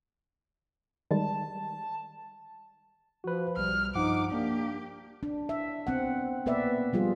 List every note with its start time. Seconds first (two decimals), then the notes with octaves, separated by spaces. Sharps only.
1.11 D#3 G3 G#3 A5
3.24 F3 F#4 B4
3.57 B1 G3 F6
3.95 G2 F3 D#4 F#5 D6
4.31 A#3 D4 G4
5.23 D4
5.49 E5
5.87 B3 C4 F#5
6.46 A#3 B3 B4 D5 E5
6.93 F3 G3 F4 G#4